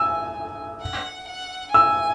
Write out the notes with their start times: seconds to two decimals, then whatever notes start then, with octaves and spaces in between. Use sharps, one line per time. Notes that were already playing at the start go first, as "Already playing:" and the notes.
Already playing: G#5 E6
0.81 F#5
1.28 F#5
1.74 G#5 E6